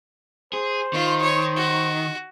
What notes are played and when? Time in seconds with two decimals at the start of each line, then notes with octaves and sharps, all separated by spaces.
0.53 G#4 C5
0.93 D#3 F4
1.22 C#5
1.56 F#4